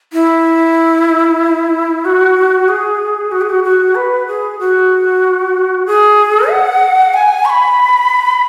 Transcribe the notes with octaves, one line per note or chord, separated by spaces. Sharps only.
E4
F#4
G#4
F#4
G#4
F#4
F#4
B4
G#4
F#4
G#4
F#5
G#5
C#6
B5